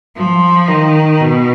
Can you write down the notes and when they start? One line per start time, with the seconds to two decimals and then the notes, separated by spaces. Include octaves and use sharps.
0.16 F3
0.68 D#3
1.20 B2